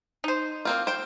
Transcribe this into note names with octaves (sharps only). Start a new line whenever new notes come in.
D#4 C5
A#3 C4 F4
C5 G5